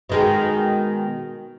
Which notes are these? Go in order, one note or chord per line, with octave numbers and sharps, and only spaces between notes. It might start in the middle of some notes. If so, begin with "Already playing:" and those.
B2 D#3 G#3